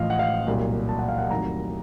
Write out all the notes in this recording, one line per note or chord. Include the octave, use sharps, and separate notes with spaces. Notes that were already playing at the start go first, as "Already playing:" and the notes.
Already playing: A1 A2 F3 A3 D#5 F5
F#5
F5
C2 A#2 F#3
A5
F#5
F5
F#5
F2 D#3 F#3 A3 A#5